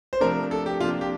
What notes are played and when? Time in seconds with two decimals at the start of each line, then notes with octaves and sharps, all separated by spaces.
0.13 C5
0.21 C3 F3 A3 D4 A#4
0.51 A4
0.66 G4
0.80 C3 F3 A#3 D4 F4
1.01 G4